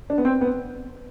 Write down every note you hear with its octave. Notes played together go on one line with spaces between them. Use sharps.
D4
B3
C4
B3